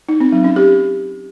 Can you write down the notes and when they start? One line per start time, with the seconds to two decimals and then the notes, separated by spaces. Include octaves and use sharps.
0.09 D#4
0.20 C4
0.32 F#3
0.44 C#4
0.56 G4